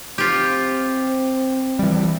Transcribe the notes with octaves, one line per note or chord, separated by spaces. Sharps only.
C4 F4 G4
E3 G3